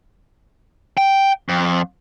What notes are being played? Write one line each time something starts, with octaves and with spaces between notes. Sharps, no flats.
G5
F2